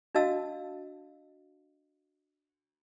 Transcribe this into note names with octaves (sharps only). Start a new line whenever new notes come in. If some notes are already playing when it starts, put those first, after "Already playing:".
D4 F#4 D#5 F5 A5 E6